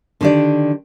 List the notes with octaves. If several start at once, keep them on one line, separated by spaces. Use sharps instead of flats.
D3 D#3 D4 G4 D5